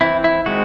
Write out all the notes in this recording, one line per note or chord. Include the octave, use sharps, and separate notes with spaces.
E3 C4 E4
E4
D#3 G#3 C4 F#4